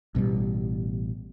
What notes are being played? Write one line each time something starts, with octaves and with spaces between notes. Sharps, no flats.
A1 B2 D3 G3